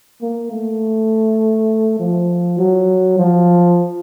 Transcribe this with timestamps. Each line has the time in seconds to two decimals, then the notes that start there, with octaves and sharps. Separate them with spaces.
0.22 A#3
0.52 A3
2.00 F3
2.59 F#3
3.19 F3